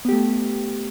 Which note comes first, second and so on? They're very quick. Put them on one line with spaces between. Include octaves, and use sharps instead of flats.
B3 G4 A3